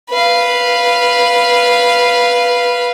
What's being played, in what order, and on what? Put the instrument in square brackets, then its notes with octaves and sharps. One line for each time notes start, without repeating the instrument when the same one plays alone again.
[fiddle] B4 F5